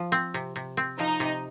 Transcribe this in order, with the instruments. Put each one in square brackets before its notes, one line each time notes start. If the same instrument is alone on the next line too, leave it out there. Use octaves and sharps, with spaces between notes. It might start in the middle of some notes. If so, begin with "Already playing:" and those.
Already playing: [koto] F3
C4
C3
C3
C4
[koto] F3 [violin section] D#4
[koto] C3